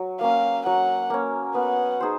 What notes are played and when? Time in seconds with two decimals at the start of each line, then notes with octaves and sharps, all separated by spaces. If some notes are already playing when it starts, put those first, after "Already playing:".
Already playing: F#3
0.21 A#3 C#4 F5
0.66 F#3 F#5
1.10 A#3 C#4
1.55 B3 F#5
2.00 D#4 G#4 C5